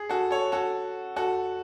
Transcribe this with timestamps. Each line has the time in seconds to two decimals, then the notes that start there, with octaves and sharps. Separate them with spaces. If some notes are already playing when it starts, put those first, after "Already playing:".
Already playing: G#4
0.10 F#4 A4
0.31 A4 C#5
0.52 F#4 A4
1.16 F#4 A4